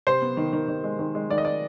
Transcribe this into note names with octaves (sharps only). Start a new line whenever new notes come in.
C3 C5
B3
D#3
D#3
D#3
G#3
D#3
G#3
D#3 D5
D#5
D5